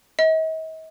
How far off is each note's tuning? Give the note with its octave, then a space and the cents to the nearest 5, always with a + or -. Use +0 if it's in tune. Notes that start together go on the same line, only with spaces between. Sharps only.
D#5 +45